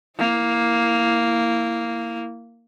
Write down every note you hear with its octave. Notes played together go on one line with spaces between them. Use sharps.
A#3 E4